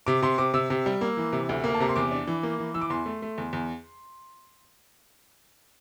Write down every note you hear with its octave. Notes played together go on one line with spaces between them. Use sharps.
C3 D6
C3 C6
C3 D6
C3 E6
C3
G3
A#3
E3
C3
D2
A#3
A5
C3 A#5
C6
E2 D6
D4
E3
A#3
E3
E3 E6
D6
E2 C6
A3
A3
E2
E2